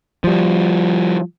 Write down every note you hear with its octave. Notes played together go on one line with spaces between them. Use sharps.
F3 G3